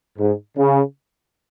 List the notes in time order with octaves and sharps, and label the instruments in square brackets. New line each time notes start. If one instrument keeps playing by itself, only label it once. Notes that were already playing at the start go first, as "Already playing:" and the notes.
[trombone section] G#2
C#3